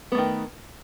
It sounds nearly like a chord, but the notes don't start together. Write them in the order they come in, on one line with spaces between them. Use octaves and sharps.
B3 A3 D#3